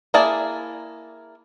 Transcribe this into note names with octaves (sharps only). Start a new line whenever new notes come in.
A#3 E4 G#4 D5 A5